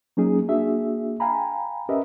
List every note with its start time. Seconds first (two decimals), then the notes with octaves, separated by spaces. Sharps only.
0.17 F#3 A#3 C#4 D#4 G#4
0.48 A#3 D4 F#4 G#4 E5
1.20 F5 G5 G#5 A#5 B5
1.89 C#4 G4 A#4 B4 D#5 E5